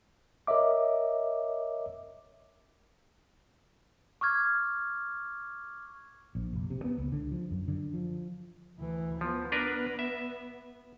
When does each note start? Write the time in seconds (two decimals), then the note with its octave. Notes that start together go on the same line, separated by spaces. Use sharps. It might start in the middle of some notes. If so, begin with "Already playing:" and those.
0.47 A#4 C#5 D#5 E5 D6
4.21 C#6 D6 F6 G#6
6.35 A#1
6.53 F1
6.70 C3
6.84 B3
6.98 C#2
7.12 D3
7.31 F3
7.51 F#2
7.68 D3
7.94 F3
8.78 D2 E3
9.21 F3 B3
9.52 D4 A#4 B4
9.99 E5